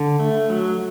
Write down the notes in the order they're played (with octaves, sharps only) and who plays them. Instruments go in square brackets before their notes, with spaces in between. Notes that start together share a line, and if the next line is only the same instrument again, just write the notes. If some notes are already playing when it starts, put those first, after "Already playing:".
Already playing: [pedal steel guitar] D3
A3
F#3